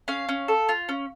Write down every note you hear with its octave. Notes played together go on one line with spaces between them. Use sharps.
C#4 F5
C#4
A4
F4
C#4